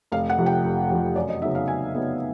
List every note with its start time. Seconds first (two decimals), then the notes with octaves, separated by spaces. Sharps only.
0.12 F1 F5
0.30 F#5
0.38 F2 C3 F3
0.46 G5
0.64 F1
0.90 F2 C3 F3
1.16 F#2 D5
1.29 D#5
1.42 C#3 F#3 B3 D#4 E5
1.55 F5
1.67 F#2 G#5
1.94 C#3 F#3 B3 D#4